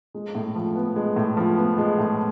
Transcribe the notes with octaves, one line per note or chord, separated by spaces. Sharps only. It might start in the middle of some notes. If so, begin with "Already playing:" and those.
G#3
A2
F3
B3
G#3
A2
F3
B3
G#3
A2